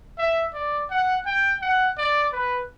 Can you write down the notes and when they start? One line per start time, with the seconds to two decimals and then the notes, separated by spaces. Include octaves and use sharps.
0.18 E5
0.54 D5
0.90 F#5
1.26 G5
1.62 F#5
1.98 D5
2.33 B4